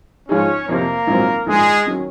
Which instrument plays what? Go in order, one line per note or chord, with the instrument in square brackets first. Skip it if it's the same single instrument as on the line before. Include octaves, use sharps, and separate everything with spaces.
[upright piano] G#2 F3 G#3 D#4 G#4 [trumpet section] C#4 C#5
[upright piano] F2 C3 F3 [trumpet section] A#3 A#4
[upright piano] A#1 G#2 D#3 F#3 C4
[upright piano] A#1 G#2 D#3 [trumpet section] G#3 G#4
[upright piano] D#3 F#3 C#4